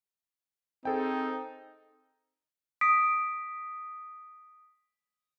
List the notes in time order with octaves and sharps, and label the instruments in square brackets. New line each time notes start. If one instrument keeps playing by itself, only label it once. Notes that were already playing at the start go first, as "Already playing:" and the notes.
[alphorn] C4 [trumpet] D#4 [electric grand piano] G#4 A4 G5
[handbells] D#6 B6 D7